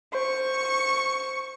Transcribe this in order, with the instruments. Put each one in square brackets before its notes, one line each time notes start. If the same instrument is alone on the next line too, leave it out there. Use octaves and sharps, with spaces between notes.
[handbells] C5 [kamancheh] C#6